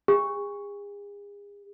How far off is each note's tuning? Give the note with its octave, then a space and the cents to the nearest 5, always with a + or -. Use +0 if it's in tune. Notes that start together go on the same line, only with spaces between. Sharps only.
G#4 -40